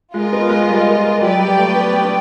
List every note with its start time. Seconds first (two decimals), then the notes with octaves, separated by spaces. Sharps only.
0.14 G#3 F4 A#4 D#5
0.32 B3
0.50 G#3
0.69 G3
1.21 F#3 G4 B4 D5 G5
1.39 G3
1.57 A3
1.75 B3
2.03 D4